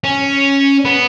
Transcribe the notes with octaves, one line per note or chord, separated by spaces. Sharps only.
C#4
B3